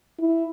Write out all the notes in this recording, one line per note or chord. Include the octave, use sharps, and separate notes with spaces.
E4